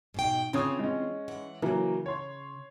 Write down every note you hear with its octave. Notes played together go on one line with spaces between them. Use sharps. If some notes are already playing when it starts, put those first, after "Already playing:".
G#2 B2 G5
C#3 E3 C4 F4 C#5 D#6
G#3 C#4
E3 F#5
C#3 E3 F#3 A#3
C#5 C6